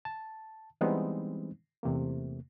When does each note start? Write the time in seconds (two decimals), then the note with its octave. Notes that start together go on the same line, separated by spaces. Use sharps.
0.05 A5
0.81 E3 G3 G#3 B3 C4 D#4
1.83 E2 C3 A3 A#3